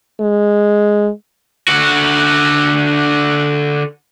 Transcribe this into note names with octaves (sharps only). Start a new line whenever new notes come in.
G#3
D3 F#4